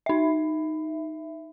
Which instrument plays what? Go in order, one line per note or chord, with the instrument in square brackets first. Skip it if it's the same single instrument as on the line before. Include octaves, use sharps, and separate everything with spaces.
[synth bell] D#4 E5